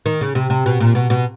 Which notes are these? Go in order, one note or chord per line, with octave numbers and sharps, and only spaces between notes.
D#3
C#3
C3
C3
B2
A#2
B2
B2